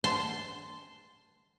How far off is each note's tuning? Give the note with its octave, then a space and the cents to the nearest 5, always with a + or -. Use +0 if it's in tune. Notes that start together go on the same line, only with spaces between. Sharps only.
A5 +0 C6 -10